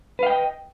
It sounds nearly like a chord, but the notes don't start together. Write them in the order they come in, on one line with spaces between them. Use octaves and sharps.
B4 F5 G5 D#5